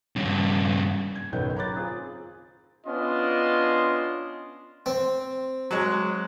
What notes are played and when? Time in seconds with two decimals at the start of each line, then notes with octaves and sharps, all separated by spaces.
0.16 G2 C#3
1.15 G#6
1.32 F#1 B1 D#3 B4 G5 G6
1.56 C#5 A#5 B5 D6 F#6 A6
1.77 C4 F4 G#4
2.86 B3 C#4 D4 F4 D#5 C6
4.86 C4
5.71 F#3 G#3